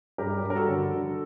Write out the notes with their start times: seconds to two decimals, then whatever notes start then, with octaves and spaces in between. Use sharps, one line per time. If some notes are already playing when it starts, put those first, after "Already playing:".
0.18 G2 G4 A#4
0.44 G2
0.50 A#4
0.55 F#4 A4
0.68 D3
0.94 D3